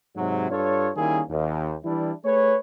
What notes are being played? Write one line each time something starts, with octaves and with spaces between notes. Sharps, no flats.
G#2 C3 F#3
G2 F4 A4 C#5
D#3 G3 A#3 C#4 E4 G#4
D#2
E3 G3 D4 E4
A3 G#4 B4 C#5